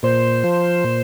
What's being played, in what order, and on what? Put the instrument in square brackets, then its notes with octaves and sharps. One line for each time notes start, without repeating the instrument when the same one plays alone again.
[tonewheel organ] A#2 C5
F3
A#2